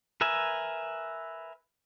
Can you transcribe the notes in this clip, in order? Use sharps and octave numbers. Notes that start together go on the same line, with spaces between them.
A#4 B4 E5 G#5